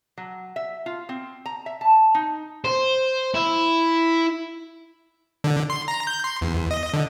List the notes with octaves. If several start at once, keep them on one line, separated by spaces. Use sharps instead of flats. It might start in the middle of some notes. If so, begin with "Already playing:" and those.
F#3
E5
F4
C4
A#5
E5
A5
D#4
C5
E4
D3
C6
A#5
G6
C6
E2
D#5
D3